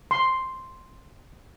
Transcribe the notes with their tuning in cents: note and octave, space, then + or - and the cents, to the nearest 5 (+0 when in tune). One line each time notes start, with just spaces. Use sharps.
C6 +0